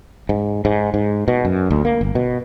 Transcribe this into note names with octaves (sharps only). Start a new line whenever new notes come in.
G#2
G#2
G#2
B2
F#2
D2
A#3
G1
B2